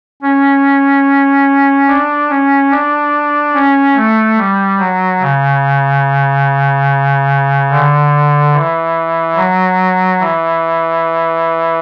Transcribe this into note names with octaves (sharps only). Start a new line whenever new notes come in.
C#4
D4
C#4
D4
C#4
A3
G3
F#3
C#3
D3
E3
F#3
E3